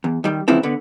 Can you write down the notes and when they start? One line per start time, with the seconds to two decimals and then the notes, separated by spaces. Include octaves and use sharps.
0.04 E2
0.24 D#3 G3
0.48 G#2 C#3 E3 F3 C4 E4
0.63 D3 B3